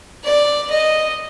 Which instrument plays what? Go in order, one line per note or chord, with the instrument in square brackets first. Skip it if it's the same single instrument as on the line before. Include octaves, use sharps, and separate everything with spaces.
[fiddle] D5
D#5